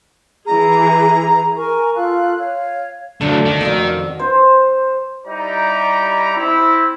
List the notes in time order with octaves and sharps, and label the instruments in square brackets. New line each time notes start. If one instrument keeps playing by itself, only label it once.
[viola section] E3 G#4 [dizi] A#5
[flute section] A#4 G#5 C#6
F4 A4 F5 F#6
C#5 F5
[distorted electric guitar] D3 F#3 [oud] A3 D4
[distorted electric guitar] D#3
[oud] F2 F#4 D5
[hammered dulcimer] C5
[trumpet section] G3 D#4 E4 G4 D5 A#5
C4 E4